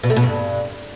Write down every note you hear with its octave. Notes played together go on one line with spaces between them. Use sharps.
B2
A3
B2
G2